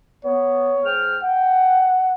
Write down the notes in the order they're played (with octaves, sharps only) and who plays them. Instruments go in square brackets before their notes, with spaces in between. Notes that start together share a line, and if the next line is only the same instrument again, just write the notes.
[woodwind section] B3 [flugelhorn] C#5
[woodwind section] G#2 G5 F6
[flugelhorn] F#5 [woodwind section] G5